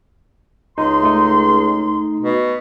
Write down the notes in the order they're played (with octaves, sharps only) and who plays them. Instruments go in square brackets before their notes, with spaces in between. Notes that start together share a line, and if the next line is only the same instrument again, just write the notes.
[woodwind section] C#2 C6 [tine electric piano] D#4
[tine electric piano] A3 D#4
[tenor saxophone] B2